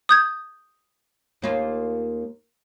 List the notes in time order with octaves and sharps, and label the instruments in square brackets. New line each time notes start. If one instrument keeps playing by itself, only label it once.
[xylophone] D#6 G6 G#6
[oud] D#2 A#3 F4